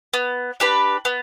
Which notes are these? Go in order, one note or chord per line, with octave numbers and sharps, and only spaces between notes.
B3
D4 G4 B4
B3